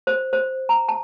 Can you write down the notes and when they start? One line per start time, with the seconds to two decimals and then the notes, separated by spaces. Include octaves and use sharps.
0.07 C5
0.33 C5
0.69 A#5
0.89 A5